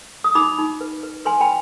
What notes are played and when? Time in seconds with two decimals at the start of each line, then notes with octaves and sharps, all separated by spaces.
0.24 D#6
0.35 D#4 B5 D6
0.59 D#4
0.81 B4
1.03 B4
1.25 B4 G#5 C6
1.41 G5 B5